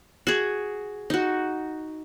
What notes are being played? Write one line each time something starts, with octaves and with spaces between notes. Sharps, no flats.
F#4 G#4
D#4 F#4